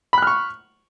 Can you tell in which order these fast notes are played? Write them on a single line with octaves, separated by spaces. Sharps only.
B5 F#6 F6 C#6